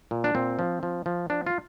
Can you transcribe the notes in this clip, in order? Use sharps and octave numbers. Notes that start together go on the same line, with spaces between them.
A#2
D4
A#2 C4
F3
F3
F3
F3 D4
F4